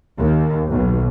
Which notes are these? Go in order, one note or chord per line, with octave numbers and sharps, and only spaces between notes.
D#2
B1